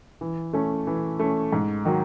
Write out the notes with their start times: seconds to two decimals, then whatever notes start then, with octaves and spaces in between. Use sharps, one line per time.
0.21 E3
0.53 A3 C#4
0.87 E3
1.19 A3 C#4
1.52 G#2
1.85 D#3 F#3